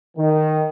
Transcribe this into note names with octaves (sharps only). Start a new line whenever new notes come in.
D#3